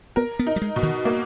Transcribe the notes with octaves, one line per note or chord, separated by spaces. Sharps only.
B3 A#4
B3
D#4
G3
G#3
B2
D#3
A#3